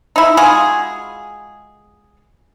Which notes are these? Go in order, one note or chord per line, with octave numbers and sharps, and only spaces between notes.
D#4 E4
G#3 F4 F#4 G#4